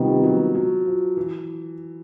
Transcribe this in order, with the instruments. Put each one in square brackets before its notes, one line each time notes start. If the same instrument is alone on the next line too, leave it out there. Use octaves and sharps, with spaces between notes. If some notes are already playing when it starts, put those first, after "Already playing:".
Already playing: [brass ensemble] C3 D#3 G3 B3 [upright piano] F3
[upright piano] F#3
F#3
F3
E3